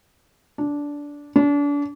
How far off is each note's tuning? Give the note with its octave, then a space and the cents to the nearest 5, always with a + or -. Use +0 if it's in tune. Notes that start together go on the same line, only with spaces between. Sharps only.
D4 -15
D4 -35